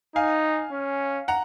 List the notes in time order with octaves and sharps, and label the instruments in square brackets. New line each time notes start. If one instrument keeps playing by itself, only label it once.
[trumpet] D#4 [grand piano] F5 G#5
[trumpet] C#4
[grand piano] F#5 A#5